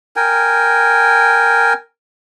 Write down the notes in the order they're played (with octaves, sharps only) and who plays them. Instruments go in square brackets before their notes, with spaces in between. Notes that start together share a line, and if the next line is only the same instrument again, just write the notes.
[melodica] A#4 G5 G#5